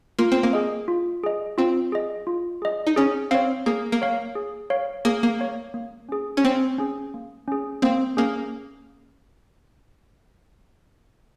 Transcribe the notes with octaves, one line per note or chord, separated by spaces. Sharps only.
A#3 F4
C4
A#3
G#4 D#5
F4
G#4 D#5
C4 F4
G#4 D#5
F4
G#4 D#5
D#4
C#4 G#4
C4 C#5 F5
A#3 G#4
A#3
C#5 F5
G#4
C#5 F5
A#3 G#4
A#3
C#5 F5
A#3
C#4 G#4
C#4
A#3 C4
C#4 G#4
A#3
C#4 G#4
A#3 C4
A#3 C#4 G#4